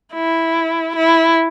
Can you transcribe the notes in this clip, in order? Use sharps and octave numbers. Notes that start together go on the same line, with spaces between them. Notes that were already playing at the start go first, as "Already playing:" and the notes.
E4
E4